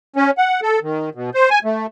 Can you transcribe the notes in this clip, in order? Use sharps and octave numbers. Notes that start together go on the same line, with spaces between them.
C#4
F#5
A4
D#3
B2
C5
G#5
A3